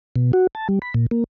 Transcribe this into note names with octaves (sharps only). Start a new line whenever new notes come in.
B2
F#4
A5
G3
B5
A#2
A#3